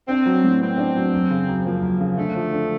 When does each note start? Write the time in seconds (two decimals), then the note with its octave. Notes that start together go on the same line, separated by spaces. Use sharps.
0.08 C4 D4
0.26 F#3
0.44 A2
0.61 B3 C4
0.78 D4
0.96 F#3
1.13 F#2
1.31 C#3
1.48 F#2
1.65 F3 A#3
1.82 F#2
2.00 C#3
2.18 D3 A3
2.35 F3
2.52 D3